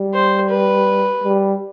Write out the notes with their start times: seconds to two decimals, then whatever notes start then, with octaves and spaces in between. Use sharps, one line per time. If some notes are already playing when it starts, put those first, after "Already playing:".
Already playing: G3
0.14 C5
0.50 B4
1.24 G3